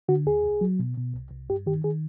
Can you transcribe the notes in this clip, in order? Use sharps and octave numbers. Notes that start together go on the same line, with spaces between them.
D3 F#4
D#2 G#4
C2
F#3
B2
B2
C2
C2
G2 G4
D#3 G4
D#3 G#4